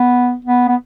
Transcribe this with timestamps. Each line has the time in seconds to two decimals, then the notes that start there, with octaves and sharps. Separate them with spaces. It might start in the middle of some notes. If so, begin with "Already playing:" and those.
Already playing: B3
0.45 B3
0.68 B3